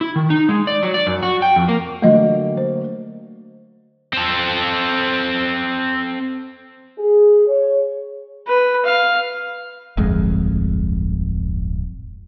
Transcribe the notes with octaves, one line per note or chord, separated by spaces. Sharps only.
E4
D#3
D#4
G#3
D5
F#3
D5
F#2
F#4
G5
F2
A#3
D3 F#3 A3 A#3 D#5
C5
C4 A4
G#4
C#5
B4
F5
D1 G1 F2 G#3